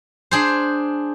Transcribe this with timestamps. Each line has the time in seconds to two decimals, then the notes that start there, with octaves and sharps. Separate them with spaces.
0.31 D4 G#4 C5